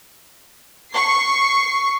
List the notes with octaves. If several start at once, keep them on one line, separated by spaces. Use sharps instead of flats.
C#6 C7